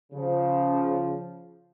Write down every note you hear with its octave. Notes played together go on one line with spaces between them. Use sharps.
C#3 F3